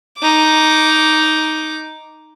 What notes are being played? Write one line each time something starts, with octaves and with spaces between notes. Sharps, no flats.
D#4 D6